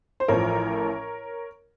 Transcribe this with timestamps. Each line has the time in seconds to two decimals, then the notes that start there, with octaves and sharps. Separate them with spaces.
0.20 C5
0.28 A1 A2 F3 A#4 C#5